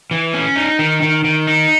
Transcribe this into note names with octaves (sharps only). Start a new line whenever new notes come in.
E3
C#4
D#4
D#3
D#3
D#3
D#4